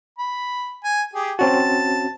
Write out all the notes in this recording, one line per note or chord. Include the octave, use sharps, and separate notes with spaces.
B5
G#5
G4 G#4
C4 C#4 F#4 A5